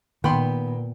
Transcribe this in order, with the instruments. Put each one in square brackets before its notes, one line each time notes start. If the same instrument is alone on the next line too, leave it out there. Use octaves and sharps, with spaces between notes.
[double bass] A#2 [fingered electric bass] D#3 [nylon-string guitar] B3 [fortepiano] G5 B5 C6